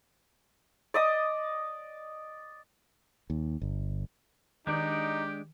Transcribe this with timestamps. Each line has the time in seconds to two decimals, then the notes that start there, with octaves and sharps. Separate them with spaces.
0.94 D5 D#5 D#6
3.30 D#2
3.62 G1
4.67 D#3 G#3 D4 D#4 G4 D5